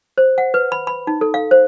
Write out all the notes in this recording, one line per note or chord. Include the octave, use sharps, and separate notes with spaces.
C5
F#5
B4
B5
B5
D#4
A4
F5
C5